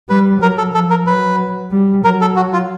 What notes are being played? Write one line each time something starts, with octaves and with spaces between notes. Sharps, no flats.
G3 B4
F#3 A#4
A4
F3 A4
A#4
F#3 B4
G3
F#3 A#4
A4
F#4
F4